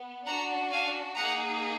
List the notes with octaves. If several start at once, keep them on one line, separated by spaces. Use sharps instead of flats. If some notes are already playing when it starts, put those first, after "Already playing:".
Already playing: B3
D4 F#4 F#5 A#5
F5 G#5
A#3 D#4 G#4 F#5 A#5